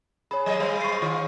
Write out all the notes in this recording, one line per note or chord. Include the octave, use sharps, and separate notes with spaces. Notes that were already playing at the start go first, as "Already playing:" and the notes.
G#4 C#5 B5
F#3 G#3 D#5
G3 G#3 C5
C#6 C7
D#3 F4 C#5